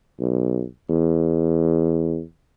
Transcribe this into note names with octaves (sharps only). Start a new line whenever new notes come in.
B1
E2